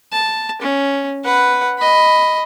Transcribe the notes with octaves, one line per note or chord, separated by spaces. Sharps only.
A5
C#4
B4 F#5
D#5 B5